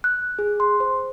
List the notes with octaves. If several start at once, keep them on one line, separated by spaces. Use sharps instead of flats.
F#6
G#4
C6
C5